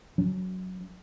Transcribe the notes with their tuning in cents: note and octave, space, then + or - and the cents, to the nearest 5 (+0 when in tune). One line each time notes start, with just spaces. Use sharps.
F#3 +0 C#4 +25